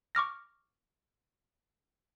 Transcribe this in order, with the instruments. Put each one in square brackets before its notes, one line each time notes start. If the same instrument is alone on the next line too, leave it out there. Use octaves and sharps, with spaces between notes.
[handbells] C#6 D6 F6 A#6